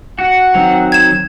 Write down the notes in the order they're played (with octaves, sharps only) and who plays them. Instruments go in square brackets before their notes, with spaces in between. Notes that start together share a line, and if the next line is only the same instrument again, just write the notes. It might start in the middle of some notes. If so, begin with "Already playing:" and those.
[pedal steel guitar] F#4 [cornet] F#5
[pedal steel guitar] D#3 F#3 C4
[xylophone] G#6 E7